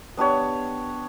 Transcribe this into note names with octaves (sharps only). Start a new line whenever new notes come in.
B3 D4 G4 C#5